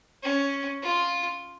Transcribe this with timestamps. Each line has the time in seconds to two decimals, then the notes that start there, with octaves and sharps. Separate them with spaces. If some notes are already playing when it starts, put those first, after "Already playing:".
0.23 C#4
0.82 F4